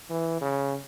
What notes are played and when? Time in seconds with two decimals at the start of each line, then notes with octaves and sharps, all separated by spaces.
0.10 E3
0.41 C#3